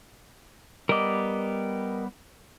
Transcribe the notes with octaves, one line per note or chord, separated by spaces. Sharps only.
G3 B3 A#4 D#5 D6